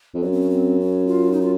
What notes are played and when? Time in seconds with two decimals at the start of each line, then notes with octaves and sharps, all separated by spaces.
0.14 F2
0.23 F#2 C#4
0.32 C4
0.41 C#4
0.50 C4
0.80 C#4
1.07 F4
1.32 D#4
1.41 F4